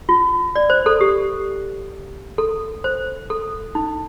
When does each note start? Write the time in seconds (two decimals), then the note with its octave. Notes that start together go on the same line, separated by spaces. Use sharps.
0.09 F4
0.56 D5
0.70 C5
0.86 A4
1.01 G4
2.38 A4
2.84 C5
3.30 A4
3.75 D#4